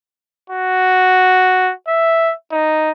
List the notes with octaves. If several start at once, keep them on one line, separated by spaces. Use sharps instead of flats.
F#4
E5
D#4